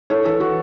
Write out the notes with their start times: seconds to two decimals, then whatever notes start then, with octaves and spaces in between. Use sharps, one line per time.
0.10 E4 A4 C#5
0.25 E3 A4
0.40 E3 F#4